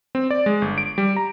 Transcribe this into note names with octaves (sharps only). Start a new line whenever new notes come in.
C4
D5
G#3
G1
D7
G3
A#5